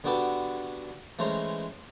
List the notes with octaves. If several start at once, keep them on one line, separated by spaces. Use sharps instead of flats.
D3 B3 F#4 G4 A4 B4
E3 G#3 A3 C#4 C5 A#5